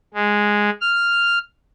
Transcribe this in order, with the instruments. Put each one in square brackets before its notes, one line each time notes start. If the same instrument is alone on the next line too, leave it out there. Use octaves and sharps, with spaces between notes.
[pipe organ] G#3
F6